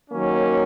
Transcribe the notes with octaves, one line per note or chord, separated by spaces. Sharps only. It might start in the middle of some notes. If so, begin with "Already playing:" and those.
D#3 F#3 A#3 C#4